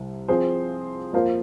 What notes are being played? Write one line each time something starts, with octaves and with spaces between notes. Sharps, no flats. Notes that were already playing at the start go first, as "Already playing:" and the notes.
Already playing: C2 C3
F3 C4 G#4 C5
F2 F3 A#3 F4 C5